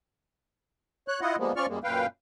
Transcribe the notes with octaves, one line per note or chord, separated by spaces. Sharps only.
C#5 F#6
E4 F4 D#5 F#5
F3 G3 G#3 A#3 B3
F3 C#4 F4 D5 C#6 F6
F#2 G3 G#3 A#3
F#2 A#2 B4 F5 G5